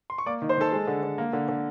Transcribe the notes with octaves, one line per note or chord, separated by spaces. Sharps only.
C6
C#6
A#3 D5 D6
D#3
C5 C6
D#3 A4 A5
G#3
D3
D3
A#3
D3
D3